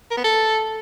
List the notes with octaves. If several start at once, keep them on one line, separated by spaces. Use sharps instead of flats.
A#4
B3
A4